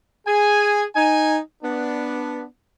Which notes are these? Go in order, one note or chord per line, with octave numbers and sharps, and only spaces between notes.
G#4 G#5
D#4 G#5
B3 D4